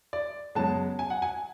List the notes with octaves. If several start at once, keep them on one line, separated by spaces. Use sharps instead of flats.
D5
F#2 C#3 G#3 B3 A5
G#5
F#5
G#5